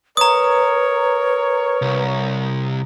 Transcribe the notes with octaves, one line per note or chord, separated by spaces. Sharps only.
A#4 B4 C#5 A#5 D#6
C2